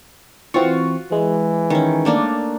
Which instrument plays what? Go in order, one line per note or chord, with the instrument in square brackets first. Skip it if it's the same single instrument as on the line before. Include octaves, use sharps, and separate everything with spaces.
[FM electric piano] E3 C4 C#6 [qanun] F4 F#4
[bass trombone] E3 [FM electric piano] G#3
[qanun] D#3 C#4
A3 A#3 D4